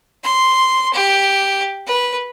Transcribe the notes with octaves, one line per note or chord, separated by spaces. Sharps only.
C6
G4
B4